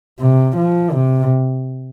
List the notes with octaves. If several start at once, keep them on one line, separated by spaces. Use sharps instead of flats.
C3
F3
C3